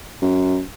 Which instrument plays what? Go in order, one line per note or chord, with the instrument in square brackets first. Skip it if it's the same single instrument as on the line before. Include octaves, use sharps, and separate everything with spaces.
[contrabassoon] F#2